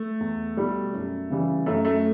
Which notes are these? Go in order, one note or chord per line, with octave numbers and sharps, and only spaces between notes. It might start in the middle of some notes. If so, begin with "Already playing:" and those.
Already playing: A3
E2
B2 G3
F#2
C#3 E3 G3
F#2 A3
A3